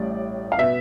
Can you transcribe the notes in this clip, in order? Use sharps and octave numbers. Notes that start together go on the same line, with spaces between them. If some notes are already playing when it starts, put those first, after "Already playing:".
Already playing: A1 A2 G3 D5
F5
B2 B3 E5